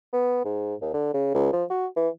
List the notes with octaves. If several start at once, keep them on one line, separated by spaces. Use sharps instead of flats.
B3
G#2
D#2
D3
C#3
C#2
F3
F#4
E3